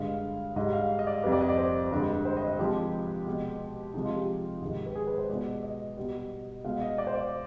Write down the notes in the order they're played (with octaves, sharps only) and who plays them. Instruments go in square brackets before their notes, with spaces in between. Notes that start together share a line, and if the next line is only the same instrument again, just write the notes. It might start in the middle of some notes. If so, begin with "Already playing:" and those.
Already playing: [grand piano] G2 D3 G#3 F5
G#2 G3 D#5
F5
D#5
D5
F2 C3 G3 B4
D5
D#5
D5
C5
G2 D3 G#3
C5
D#5
D#5
C3 F3 G#3 G4
B2 G#3
C3 F3 G#3 D#4
F4
G4
G#2 D#3 G#3
B4
G#4
B4
C5
B2 G#3 D5
D#5
B2 G3
B2 G#3 F5
D#5
D5
C5
D5